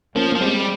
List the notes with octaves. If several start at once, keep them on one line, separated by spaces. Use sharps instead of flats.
F3 A#3 C#4
F3 A#3
G3 G#3 C4